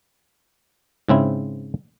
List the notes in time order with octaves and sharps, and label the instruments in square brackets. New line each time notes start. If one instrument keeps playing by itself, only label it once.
[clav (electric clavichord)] G#2 C#3 C4 E4